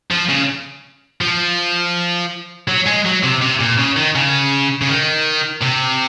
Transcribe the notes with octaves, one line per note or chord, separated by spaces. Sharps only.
F3
C#3
F3
F#3
G#3
F#3
C3
C3
A#2
C#3
D#3
C#3
C#3
D#3
C3